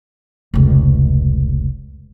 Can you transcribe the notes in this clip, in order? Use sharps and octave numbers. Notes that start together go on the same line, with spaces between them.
F1 C#2